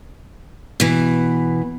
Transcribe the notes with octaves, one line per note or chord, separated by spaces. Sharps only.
B2 E3